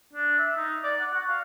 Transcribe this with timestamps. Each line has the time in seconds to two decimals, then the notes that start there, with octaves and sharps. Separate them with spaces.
0.13 D4
0.38 E5
0.57 D#4
0.84 D5
1.00 F#5
1.13 F#4
1.29 F5